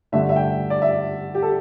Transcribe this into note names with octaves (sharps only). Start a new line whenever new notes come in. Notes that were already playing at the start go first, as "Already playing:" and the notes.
G2 D3 A3 E5
E5
G5
D5
E5
G4
A4